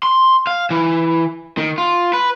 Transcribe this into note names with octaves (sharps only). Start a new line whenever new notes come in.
C6
F5
E3
D#3
F4
B4